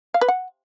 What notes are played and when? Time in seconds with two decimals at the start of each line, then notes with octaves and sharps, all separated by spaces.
0.14 F5
0.21 B4
0.28 F#5